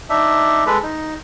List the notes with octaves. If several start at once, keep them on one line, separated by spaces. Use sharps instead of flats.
D4 D#4 E5
G#3 A4 B4
D#4